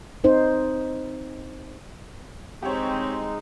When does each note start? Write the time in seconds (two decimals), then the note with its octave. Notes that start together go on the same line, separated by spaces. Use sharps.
0.24 C4 D#4 C5
2.63 G#3 C4 D#4 G4 C#5